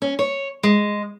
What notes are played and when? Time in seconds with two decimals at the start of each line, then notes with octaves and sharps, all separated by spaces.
0.02 C#4
0.19 C#5
0.63 G#3